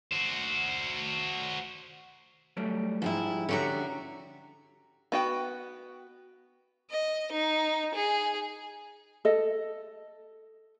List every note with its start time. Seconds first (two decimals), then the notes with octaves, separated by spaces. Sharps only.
0.13 F#4 C5
2.57 F#3 G3 A3
3.02 G#2 F3 G3 E4
3.49 D3 C#4 F#4 G4 A#5
5.12 B3 F#4 G5
6.90 D#5
7.32 D#4
7.94 G#4
9.25 A4 D#5